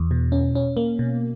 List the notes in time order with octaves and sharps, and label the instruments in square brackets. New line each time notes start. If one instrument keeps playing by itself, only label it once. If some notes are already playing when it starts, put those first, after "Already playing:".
Already playing: [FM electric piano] E2
B2
C#4
C#4
A#3
B2